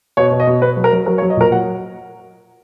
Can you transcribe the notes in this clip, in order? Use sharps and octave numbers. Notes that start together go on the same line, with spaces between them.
B2 C#5
B2
D#5
B2
B2 B4
F#3
A#4
F#3
F#3 A#4
C#5
F#3
D#5
A#2 A#4
F#3 F#5